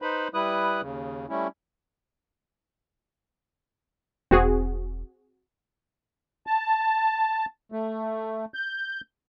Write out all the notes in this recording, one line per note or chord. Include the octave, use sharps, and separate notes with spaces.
D#4 B4 C5 B5
G3 E4 B4 D#6 F#6
D#2 C#3
G3 A3 C#4 E4
E1 C4 F#4 G#4
A5
A3
G6